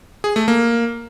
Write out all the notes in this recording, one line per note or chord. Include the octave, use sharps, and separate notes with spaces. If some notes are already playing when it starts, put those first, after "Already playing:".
G#4
A3
A#3